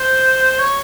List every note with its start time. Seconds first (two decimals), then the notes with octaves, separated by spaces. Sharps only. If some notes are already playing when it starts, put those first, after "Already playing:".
Already playing: C5
0.59 C#5